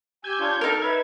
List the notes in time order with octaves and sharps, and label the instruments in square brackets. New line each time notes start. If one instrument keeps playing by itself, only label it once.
[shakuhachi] G4 [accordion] G#5 E6 [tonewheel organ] G6 G#6
[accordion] D4 F4 C#5
[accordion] F#3 [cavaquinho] D#4 A#4 [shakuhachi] A4 [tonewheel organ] F6
[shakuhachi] B4 [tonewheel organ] E5 G#6